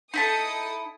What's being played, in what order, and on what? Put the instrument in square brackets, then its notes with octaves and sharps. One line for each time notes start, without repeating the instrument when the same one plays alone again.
[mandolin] D#4 E4 A5 [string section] A4 D#6 C#7